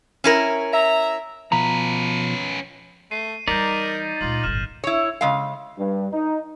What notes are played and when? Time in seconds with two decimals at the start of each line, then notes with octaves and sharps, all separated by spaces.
0.24 C#4 E4 A#4
0.72 E5 A#5
1.52 B2 F3 C#4 B4 A#5
3.11 A3 C7 D#7
3.48 E3 G3 D#4 A#4 D5 G6 A#6 B6
3.67 A6
4.21 C#2 A#2 F4 F#7
4.44 D1 G1 F6 A6 E7
4.84 E4 C#5
5.21 C#3 G#3 F5
5.77 G2
6.12 D#4